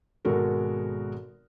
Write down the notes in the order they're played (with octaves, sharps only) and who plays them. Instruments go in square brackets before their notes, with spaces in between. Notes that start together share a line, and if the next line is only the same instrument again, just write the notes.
[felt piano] G#1 B2 G#3 F#4 A4 A#4